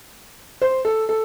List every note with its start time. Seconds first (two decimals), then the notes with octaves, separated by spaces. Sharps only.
0.62 C5
0.85 A4
1.09 A4